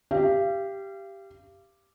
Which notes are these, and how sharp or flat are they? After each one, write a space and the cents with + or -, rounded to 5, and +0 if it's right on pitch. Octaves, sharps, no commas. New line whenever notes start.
G4 +0 F5 -35